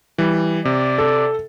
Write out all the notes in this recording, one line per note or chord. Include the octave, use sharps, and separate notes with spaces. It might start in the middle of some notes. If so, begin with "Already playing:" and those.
E3 G3
C3 D5
A4